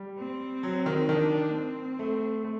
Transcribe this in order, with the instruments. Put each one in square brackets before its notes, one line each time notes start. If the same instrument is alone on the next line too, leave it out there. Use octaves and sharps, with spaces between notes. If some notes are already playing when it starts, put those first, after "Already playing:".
Already playing: [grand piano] G3
[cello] C4
[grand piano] F#3
D#3
[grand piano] D#3 [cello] D4
[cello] C4
[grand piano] A3
A3